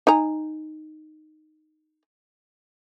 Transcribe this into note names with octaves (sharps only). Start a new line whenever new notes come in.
D#4 G#5 A#5